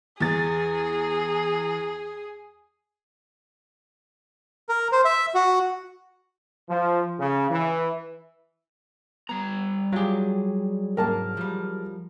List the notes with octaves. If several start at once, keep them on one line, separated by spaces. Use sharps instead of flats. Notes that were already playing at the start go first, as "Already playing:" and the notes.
E2 G#4 A6
A#4
C5
E5
F#4
F3
C#3
E3
G3 B3 A#5
F#3 F4 G4 G#4
C2 G#2 A#3 A#4 A5
F3 G3